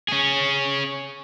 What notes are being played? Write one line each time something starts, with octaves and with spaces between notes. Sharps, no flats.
C#4 G#4